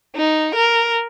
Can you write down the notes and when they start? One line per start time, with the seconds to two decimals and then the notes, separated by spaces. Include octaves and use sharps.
0.16 D#4
0.55 A#4